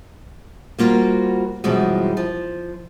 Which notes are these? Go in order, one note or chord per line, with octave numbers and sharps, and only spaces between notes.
G3 A#3 F4 F#4 C5
F#2 B2 E3 F3 G3 G#3
F3